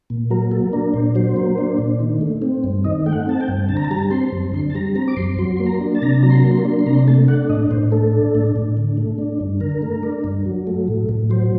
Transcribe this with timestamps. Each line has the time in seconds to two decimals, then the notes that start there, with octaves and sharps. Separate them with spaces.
0.10 A#2
0.30 F#3 A#4
0.51 A#3 A4
0.73 D4 A#4
0.94 A#2 C5
1.15 F#3 C5
1.36 A#3
1.58 D4
1.78 A#2
2.00 D#3
2.21 A3
2.42 C4
2.64 G2
2.84 D#3 D#5
3.06 A3 G5
3.13 F#5
3.26 C4 A5
3.41 G5
3.49 G2
3.69 D3 A5
3.77 A#5
3.85 A5
3.91 G3 A#5
3.99 A5
4.11 C4 C6
4.32 F#2
4.53 D3 C6
4.70 A5
4.75 G3 A#5
4.95 C4 A#5
5.08 D6
5.17 F#2 C6
5.38 F#3 C6
5.57 A#3 C6
5.66 A#5
5.80 D4
5.95 A5
6.02 C3 A#5
6.10 A5
6.23 F#3 A#5
6.30 C6
6.37 A#5
6.44 A#3
6.51 C6
6.65 D4
6.79 C6
6.86 C3 A#5
6.94 C6
7.07 A3 A5
7.28 D4 F#5
7.49 A2 D#5
7.71 A2 C5
7.92 A3 A4
8.13 D4
8.35 A2
8.56 A2
8.77 D3
8.97 A3
9.18 D4
9.40 G2
9.60 D3 A#4
9.82 A3
10.03 D4
10.24 G2
10.46 F#3
10.67 A3
10.88 A2
11.09 A2
11.30 F#3 C5